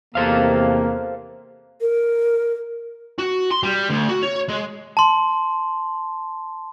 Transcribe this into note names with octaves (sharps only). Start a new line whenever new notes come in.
E2 C3 A#3 A4 C5 F5
A#4
F#4
C6
G3
D2
F#4
C#5
G#3
A5 C6